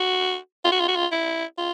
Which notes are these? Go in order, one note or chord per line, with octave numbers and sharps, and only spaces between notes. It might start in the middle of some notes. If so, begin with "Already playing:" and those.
Already playing: F#4
F4
F#4
F4
F#4
F4
E4
F4